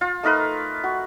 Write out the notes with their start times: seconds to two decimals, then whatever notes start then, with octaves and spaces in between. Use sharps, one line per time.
0.01 F4
0.23 A3 D#4 A#4 B4
0.84 F#4